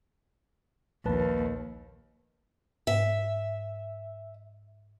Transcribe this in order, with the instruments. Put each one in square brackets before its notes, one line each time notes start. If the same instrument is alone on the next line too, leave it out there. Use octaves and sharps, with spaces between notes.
[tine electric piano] A#1 B4 A5 [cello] D#2
[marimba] G#2 [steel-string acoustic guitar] E5